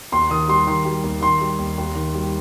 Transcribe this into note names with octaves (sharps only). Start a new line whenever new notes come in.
D#2 C6
D#3 D#6
G3 C6
D#3 C6
G3
D#2
D#3 C6
G3
D#2
D#2
D#3
G3